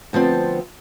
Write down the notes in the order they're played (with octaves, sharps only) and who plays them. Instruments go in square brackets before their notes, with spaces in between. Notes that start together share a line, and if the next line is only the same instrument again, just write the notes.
[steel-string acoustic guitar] D2 F3 B3 C4 A5